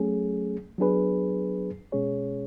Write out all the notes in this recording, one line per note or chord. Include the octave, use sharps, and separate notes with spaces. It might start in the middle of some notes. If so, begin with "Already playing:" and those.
Already playing: F#3 A3 C#4 G#4
F#3 B3 D4 G#4 B4
B2 G#3 C#4 G#4 C#5